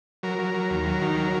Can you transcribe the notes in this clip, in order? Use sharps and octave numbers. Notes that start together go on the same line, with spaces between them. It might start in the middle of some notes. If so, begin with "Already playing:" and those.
F#3 A#4
F#3
F#3
D#2
F#3
D#3
F#3